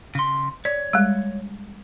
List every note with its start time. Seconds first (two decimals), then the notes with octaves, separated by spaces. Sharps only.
0.15 C#3 C6
0.65 C#5 D5
0.93 G3 G#3